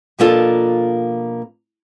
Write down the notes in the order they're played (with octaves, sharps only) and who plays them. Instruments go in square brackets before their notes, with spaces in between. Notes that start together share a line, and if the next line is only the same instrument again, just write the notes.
[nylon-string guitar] B2 F3 A#3 D4 F4 A4